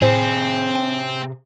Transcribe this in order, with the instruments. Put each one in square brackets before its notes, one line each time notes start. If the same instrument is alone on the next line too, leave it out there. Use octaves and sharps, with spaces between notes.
[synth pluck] A2 C5 [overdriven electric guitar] C3 G#4 [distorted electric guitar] C4
[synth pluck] G5